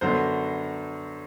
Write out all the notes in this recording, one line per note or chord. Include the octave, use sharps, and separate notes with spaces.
F#2 D3 F#3 B3 C5